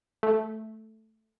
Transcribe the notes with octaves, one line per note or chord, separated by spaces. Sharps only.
A3